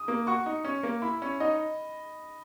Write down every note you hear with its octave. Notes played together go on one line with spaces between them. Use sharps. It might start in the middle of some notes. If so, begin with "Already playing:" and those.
Already playing: D#6
A#3
F#4 C#6
D#4
C#4
A#3
E4 B5
C#4
D#4 D#5